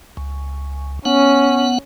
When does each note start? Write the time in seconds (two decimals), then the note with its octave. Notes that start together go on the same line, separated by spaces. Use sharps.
0.17 C#2
1.05 B3 C#4 F#5